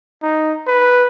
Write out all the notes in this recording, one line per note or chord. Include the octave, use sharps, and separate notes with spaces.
D#4
B4